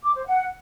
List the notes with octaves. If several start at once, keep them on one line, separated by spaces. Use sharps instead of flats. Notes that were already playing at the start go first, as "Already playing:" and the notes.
D6
C5
F#5